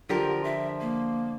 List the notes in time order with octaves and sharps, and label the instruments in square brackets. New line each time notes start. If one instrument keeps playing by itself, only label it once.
[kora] D3 G4 A#4 [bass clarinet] F3 [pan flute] F4
[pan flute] E5
A#3